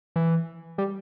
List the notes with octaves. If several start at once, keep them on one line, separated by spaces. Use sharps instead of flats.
E3
G3